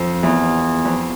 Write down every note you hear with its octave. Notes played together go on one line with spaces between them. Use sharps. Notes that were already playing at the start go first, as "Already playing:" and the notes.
Already playing: F2
E2
F2